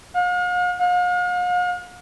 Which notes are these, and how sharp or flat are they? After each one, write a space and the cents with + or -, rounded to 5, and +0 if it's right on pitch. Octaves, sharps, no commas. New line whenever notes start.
F5 +45
F5 +45